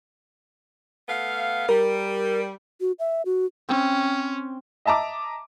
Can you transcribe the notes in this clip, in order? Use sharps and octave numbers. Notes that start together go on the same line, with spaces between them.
A3 B3 F5
G3 A#4
F#4
E5
F#4
C4 C#4
D#5 E5 A5 A#5 D6